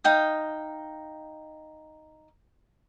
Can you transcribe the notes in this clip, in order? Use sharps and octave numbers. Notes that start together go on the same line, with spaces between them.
D#4 F5 G5 D#6